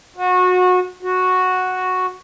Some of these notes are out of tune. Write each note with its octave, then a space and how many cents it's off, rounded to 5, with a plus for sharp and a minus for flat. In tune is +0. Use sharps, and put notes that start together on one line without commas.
F#4 -25
F#4 -5